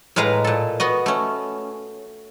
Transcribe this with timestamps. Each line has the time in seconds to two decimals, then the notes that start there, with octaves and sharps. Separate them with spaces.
0.16 A2 G#3 B4 F5 A#5
0.44 A#2 A4
0.80 B3 F#4 D#5
1.06 A3 C#4